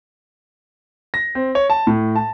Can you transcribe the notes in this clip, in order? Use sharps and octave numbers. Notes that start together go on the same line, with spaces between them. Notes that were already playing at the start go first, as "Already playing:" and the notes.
A#6
C4
C#5
A5
A2
A5